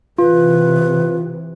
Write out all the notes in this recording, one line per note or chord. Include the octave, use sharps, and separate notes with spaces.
C3 E3 F4 B4